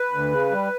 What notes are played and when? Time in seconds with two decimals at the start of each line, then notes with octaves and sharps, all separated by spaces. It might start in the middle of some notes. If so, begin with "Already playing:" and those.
Already playing: B4
0.11 D2
0.31 C#3
0.51 G3